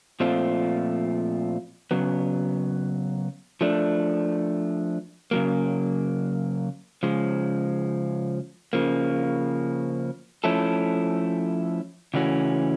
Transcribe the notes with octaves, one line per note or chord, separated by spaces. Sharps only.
A#2 F3 A3 C4 F4
C#3 F#3 B3
F3 A3 D4
C#3 F#3 A#3
C#3 F3 G#3
C#3 F3 A#3
F3 A3 C#4 E4 A4
C#3 E3 A3 C#4 F#4